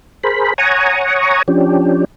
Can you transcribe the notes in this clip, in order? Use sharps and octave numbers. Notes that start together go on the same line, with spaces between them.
G#4 A#4 C5 B5
C#5 F#5 G#5 A#5 C#6 D#6
F3 C#4 D4 G4